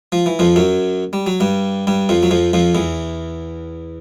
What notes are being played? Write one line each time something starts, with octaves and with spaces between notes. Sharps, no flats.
F3
E3
F2 F3
F#2 F#3
G3
F#3
G2 G3
G2 G3
F2 F3
F#3
F2 F3
F2 F3
E2 E3